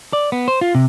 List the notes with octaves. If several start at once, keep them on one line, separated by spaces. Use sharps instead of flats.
D5
B3
C5
F4
C3